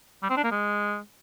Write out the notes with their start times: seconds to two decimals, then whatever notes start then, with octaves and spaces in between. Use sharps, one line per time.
0.23 G3
0.30 C4
0.37 D4
0.44 A#3
0.51 G#3